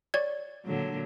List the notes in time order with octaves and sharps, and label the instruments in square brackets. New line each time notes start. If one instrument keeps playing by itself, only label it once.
[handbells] C#5 D5 G#6
[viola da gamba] A#2 D3 F#3